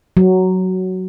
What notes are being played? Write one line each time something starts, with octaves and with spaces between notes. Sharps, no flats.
F#3